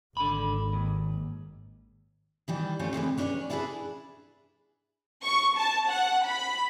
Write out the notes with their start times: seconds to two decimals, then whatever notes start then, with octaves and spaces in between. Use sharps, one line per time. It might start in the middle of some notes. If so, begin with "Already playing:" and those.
0.17 G#1 D3 B5
0.73 D#2
2.48 D#3 E3 G3
2.79 A3 C4 C#4 F4 C5 C#5
2.93 C3 D#3 E3 G#3
3.17 C#4 D4 E4 A4 B4 C#5
3.50 D4 E4 F4 G4 G#4 B4
5.23 C#6
5.57 A5
5.89 F#5
6.26 B5